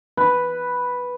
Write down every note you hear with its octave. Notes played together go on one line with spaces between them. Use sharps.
B4